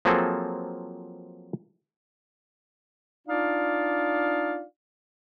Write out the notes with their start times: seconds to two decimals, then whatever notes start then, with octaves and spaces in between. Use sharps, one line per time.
0.05 F3 F#3 A#3 C4 G#4 A4
3.27 D4 D#4 F4 D5 F5